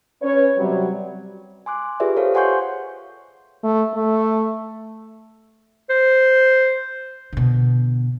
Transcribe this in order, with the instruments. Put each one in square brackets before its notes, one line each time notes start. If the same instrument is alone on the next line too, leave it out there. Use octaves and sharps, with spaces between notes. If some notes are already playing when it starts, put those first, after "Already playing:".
[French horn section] C#4 B4 C#5
C3 F#3 G3
[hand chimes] G#5 C6 D6 F#6
F4 G4 G#4 B4 D5 E5
G4 A4 C5 C#5 F5
C#5 F#5 G#5 C6 C#6 G6
[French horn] A3
A3
[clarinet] C5
[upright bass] B2 D3